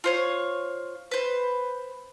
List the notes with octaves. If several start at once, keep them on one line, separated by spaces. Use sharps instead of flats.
F4 C5 C#5
B4 C5